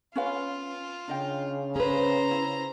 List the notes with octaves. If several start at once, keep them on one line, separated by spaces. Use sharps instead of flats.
C#4 F4 B4 F5
C#3 D4 D#5 G5
C#4 G#4 B4 C5 A#5
E4